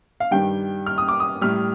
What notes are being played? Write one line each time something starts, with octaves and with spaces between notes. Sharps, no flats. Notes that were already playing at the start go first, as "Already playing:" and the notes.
F5
G2 D#3 G3 G5
F6
D#6
D6
D#6
A2 G3 F6